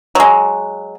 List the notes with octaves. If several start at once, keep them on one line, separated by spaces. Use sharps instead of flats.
F#3 G#3